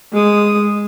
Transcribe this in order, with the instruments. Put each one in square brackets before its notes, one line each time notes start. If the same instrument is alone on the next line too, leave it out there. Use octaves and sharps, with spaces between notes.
[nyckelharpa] G#3 D#6